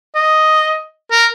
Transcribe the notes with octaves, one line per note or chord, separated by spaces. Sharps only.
D#5
A#4